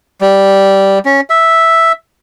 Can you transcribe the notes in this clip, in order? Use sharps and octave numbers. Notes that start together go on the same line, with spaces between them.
G3
C#4
E5